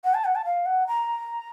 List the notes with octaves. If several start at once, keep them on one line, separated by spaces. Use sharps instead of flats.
F#5
A5
F#5
A5
F5
F#5
A#5